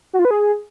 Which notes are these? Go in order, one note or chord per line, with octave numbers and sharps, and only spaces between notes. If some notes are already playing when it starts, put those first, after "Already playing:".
F#4
F4
B4
G#4